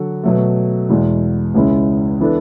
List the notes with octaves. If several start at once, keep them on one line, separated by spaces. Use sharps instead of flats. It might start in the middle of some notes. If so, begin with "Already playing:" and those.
Already playing: D3 F#3 F#4 A4
B2 F#3 A3
E2 B2 G#3
C#2 C#3 G#3 C#4 E4
E3 B3 D4 A4